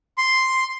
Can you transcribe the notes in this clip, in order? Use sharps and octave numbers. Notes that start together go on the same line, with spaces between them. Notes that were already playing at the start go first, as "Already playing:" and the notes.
C6